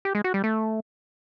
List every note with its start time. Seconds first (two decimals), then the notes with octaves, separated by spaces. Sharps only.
0.05 G4
0.15 G#3
0.24 F#4
0.34 G3
0.44 A3